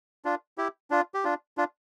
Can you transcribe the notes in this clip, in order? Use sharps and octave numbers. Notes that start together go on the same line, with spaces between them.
D4 F4
E4 G4
D4 F4
G4
D4 F4
D4 F4